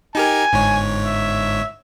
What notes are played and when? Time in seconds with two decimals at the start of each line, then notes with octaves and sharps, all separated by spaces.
0.15 D#4 G4 A#4 G#5
0.53 G1 G#2 C#5
1.05 E5